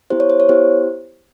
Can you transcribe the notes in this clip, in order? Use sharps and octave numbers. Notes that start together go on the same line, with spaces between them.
B3 E4 G4 C5
C#5
C5
C#5
B3 E4 G4 C5